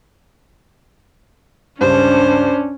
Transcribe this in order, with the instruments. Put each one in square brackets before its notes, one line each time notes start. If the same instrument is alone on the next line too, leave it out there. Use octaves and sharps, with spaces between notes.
[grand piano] C#2 G2 [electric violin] C#4 [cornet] D4 [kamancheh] C5